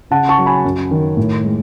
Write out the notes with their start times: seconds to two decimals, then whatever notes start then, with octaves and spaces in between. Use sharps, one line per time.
0.11 C#3 F#5 A5
0.29 A5 C#6
0.38 F#3
0.46 G#5 B5
0.65 F#2
0.91 D#3
1.17 A2
1.44 G#3